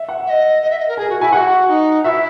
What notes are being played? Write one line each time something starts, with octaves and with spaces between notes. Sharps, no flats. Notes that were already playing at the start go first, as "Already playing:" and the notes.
Already playing: E5
F#5
E5
D#5
D#5
E5
D#5
A#4
G#4 G#5
F#4
E4 G#5
F#4 G#4 F#5
D#4
E4 F#4 E5